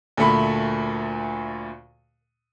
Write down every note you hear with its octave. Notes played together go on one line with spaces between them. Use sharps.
D2 A#2 A3 B5